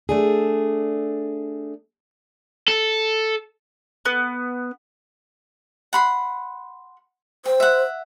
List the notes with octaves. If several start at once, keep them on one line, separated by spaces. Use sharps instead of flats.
A3 D4 G#4
A4
B3
F#5 B5 C6
C5 G5
E5 F#5